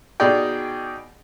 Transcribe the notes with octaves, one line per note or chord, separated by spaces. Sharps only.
B2 D#4 G#4 D5 D#5 G5